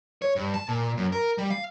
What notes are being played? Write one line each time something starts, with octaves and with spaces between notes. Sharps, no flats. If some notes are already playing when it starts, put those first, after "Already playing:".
C#5
G2
A5
A#2
F#2
A#4
G3
F5